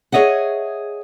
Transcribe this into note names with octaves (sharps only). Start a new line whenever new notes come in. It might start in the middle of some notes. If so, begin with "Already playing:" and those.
G#4 C#5 D#5 E5 F#5